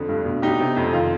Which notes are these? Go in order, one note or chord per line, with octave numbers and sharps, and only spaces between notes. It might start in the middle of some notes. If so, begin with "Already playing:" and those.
Already playing: F2 D3
G2
B2
B2 D#4 G4
C3
F2
D#3 F4